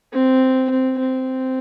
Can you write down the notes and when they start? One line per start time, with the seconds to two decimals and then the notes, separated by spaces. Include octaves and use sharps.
0.13 C4
0.70 C4
0.99 C4